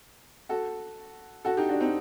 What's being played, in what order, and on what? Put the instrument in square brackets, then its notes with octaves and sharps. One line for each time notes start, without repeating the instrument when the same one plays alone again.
[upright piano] F#4 A4
F#4 A4
D#4 G4
D4 F#4
C4 D#4